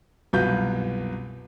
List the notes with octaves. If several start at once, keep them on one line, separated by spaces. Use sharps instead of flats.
C2 F#2 B2 F4 B4 G6